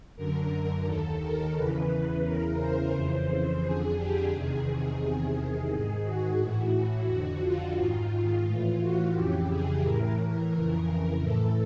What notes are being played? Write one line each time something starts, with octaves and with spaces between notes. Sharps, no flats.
F#2 D3 A#4
D#2 D#3 A4
A#4
E2 C#3 E3 B4
E2 C#3 E3 A#4
C5
F2 C#3 E3
C5
F2 D3 G#4
G4
E2 C3 D#3 G#4
E2 C3 D#3
G#4
G#2 D#3
F#4
A2 E3
F2 D3 F#4
F4
G#2 D#3
A2 E3
F#4
F2 C#3 E3 G4
G#4
A2 E3 A#4
F2 C#3 E3
A2 E3 A4